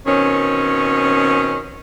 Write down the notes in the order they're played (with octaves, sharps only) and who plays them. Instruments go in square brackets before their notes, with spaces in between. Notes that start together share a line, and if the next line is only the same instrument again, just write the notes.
[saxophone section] B2 D#3 C4 C#4